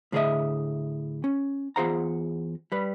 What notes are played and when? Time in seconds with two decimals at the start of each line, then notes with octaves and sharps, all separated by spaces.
0.12 A2 D3 G#4 A4 D#5 E5
1.24 C#4
1.76 E2 F4 G#4 C5 F#5 A#5
2.72 G3 B4